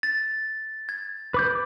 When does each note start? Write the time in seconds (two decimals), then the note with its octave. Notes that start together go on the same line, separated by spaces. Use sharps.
0.03 A6
0.89 G#6
1.34 B4 D6 G6